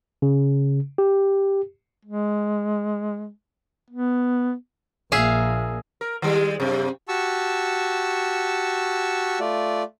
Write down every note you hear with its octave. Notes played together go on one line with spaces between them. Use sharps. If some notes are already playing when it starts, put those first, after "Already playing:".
C#3
G4
G#3
B3
A#1 A#2 G#4 E5 F5
A#4
D#3 G3 G#3
F#2 C3
F#4 G4 A5 C#6 E6
A3 F4 D5